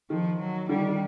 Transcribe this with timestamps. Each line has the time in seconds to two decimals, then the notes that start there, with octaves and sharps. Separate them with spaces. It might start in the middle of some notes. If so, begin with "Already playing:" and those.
0.10 D#3 F3
0.40 F#3
0.69 D3 G3
0.79 D#3
0.89 D#3